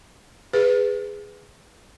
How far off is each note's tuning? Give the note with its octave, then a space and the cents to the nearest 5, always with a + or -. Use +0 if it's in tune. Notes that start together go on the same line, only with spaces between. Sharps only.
G#4 -5 B4 +10